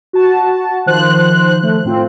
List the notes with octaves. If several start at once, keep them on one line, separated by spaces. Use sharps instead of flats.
F#4 A5
D#3 F3 C5 F#6
A3
A2 C4 F4